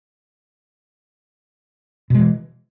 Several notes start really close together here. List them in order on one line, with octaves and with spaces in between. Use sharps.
B2 G#3 E3